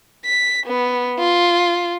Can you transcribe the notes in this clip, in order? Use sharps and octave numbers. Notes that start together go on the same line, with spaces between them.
B6
B3
F4